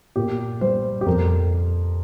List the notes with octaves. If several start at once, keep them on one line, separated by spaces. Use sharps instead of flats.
A#2 G4
G3 C5
G4
F2 A#4